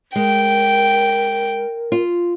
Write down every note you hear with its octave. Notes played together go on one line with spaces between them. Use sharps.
G#3 A#4 G5
F4